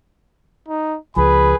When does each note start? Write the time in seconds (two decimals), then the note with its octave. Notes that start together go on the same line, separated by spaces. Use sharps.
0.68 D#4
1.16 C#2 F3 G#4 B4 B5